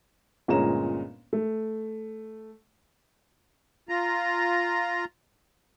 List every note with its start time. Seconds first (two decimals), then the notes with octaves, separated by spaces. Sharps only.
0.48 G1 A#2 G#3 C#4 A#5 E7
1.33 A3
3.89 F4 A#5